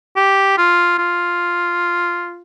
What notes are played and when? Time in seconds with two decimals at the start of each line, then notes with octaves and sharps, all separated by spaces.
0.16 G4
0.57 F4
0.98 F4